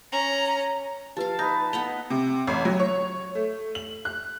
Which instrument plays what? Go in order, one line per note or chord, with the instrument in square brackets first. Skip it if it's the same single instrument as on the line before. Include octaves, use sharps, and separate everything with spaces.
[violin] C#4 A#5
[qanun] F3 F5 [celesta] G4 B4 [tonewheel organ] A5
[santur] D#4 B4 [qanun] F5 [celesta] G6 A#6
[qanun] B3 A4 D#5 [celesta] F7
[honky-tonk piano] C3
A1
F#3
C#5
A3
F#7
F#6